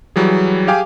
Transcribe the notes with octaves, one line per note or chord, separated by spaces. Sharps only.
E3 F#3 G3 G#4
G4 G#4 F5 G5 G#5 D6